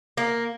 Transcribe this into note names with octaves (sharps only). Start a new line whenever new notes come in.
A#3